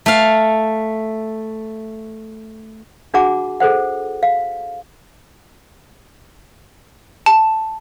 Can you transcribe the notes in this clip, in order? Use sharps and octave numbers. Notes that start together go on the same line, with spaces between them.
A3 F5
D4 F#4 G#4 F#5 A#5 D6
G#4 A4 C5 F#5
F5
A5